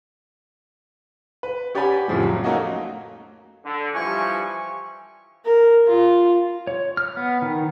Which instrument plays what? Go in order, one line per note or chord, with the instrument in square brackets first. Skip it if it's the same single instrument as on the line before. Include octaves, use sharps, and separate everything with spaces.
[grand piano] B4
C#4 G4 D5 F#5 G#5 B5
F2 A2 C#3 F3 G3
F#3
A3 A#3 C#4 D#4 F#4
[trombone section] D3
[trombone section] E3 F3 G3 [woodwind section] G#5 C#6
[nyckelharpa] A#4
F4
[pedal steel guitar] C#5
F6
B3
D#3